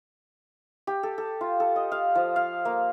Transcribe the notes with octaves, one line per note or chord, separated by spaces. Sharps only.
G4
A4
A4
F4
A4
D#5
F5
F3
F5
A#3